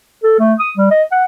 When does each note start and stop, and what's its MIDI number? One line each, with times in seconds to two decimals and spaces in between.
0.23 0.37 69
0.39 0.54 57
0.59 0.71 87
0.77 0.88 55
0.91 1.03 75
1.12 1.25 78